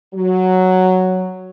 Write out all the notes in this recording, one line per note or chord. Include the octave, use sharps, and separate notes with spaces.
F#3